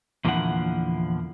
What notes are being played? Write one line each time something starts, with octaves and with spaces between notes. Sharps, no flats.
E2 A#2 D3 F3 E4 F#5